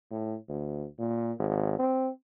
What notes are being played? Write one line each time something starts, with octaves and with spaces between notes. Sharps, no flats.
A2
D2
A#2
G#1
C4